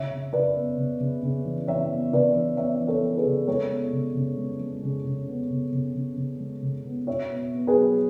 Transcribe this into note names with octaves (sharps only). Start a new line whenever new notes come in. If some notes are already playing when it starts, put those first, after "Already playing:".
Already playing: C#3 C#5 E5
C#3
C#3 B4 D5
B3
C#3
C#3
C#3
E3
E3 C#5 E5
B3
C#3 B4 D5
E3
B3 C#5 E5
E3
A4 C#5
E3
G#4 B4
C#3
G#3 A4 C#5
B3
C#3
C#3
G#3
G#3
C#3
C#3
B3
C#3
C#3
C#3
C#3
G#3
C#3
B3
B2 C#5 E5
B3
B3
G#4 B4
F#3